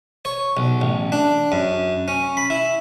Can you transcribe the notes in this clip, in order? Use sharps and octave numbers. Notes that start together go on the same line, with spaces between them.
C#5
B1
A1
D4
F#2
C#4
B5
E4